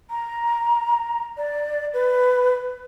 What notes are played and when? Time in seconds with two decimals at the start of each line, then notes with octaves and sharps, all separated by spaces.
0.10 A#5
1.37 D5
1.94 B4